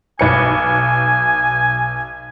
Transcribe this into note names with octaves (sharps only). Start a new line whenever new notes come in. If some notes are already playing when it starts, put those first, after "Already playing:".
B1 B4 G#5 C#7